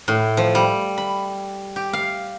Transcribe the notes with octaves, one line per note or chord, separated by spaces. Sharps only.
A2
F3
G3
B5
G4
F5